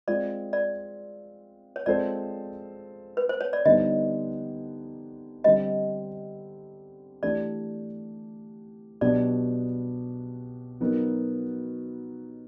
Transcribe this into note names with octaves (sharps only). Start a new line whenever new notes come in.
G#3 C4 F4 D5
D5
C#5
G#3 C4 F4 A4 C5 D5
B4
C5
C#5
D5
D3 G3 B3 D#4 D#5
D3 G3 C4 D#5
E3 A3 D4 G4 D5
B2 F#3 B3 D4 G4 D5
F#3 B3 D#4 F#4 A#4